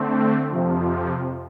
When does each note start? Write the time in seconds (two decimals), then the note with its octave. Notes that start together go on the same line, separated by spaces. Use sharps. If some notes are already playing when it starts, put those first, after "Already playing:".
Already playing: D3 A3 C4
0.50 F2 C3 F3